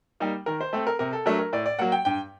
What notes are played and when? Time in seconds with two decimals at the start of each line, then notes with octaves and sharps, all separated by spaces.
0.20 G3 A#3 D#4
0.46 D#3 A#4
0.61 C5
0.73 A3 C4 A4
0.87 A#4
0.99 C3 A#4
1.13 A4
1.26 F#3 A3 D4 A#4
1.39 A#4
1.53 A2 D5
1.66 D5
1.79 F#3 A#3 F#5
1.92 G5
2.05 G2 G5